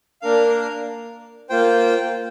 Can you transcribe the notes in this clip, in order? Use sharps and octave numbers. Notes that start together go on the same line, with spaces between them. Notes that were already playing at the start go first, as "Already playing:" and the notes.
A#3 D4 A#4 F5
A#3 F4 C5 G5